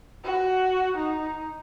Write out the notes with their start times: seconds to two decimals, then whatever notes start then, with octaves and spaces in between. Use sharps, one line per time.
0.24 F#4
0.96 D#4